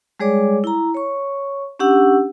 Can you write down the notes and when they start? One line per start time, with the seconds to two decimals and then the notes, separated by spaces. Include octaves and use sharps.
0.20 G3 G#3 G#4 C#5 D5 D6
0.64 E4 A#5
0.95 C#5 C#6
1.79 C#4 D4 G4 F#5 E6